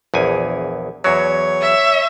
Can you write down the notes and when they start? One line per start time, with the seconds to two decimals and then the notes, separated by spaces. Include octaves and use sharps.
0.14 A#1 E2 G#5
1.04 E2 F#3 C#5
1.62 E5